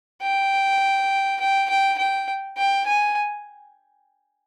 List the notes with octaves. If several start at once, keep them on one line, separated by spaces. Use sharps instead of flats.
G5
G5
G5
G5
G5
G#5